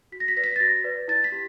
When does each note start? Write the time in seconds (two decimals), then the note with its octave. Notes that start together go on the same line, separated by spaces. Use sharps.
0.12 F#4 B6
0.20 A#6
0.28 B6
0.37 B4 D5 A#6
0.44 B6
0.56 A6
0.60 F#4 A#6
0.84 B4 D5
1.08 E4 A6
1.24 B6
1.32 G4